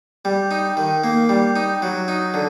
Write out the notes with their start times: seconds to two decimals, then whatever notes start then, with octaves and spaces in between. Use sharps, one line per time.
0.25 G3
0.51 D#4
0.77 D#3
1.04 A#3
1.29 G3
1.56 D#4
1.82 F#3
2.08 D#4
2.34 D3